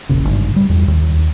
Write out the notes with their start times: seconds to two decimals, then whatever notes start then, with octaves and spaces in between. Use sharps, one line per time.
0.09 E1 A#1 C#3
0.25 G#1 G2
0.56 G3
0.70 E2
0.88 D#2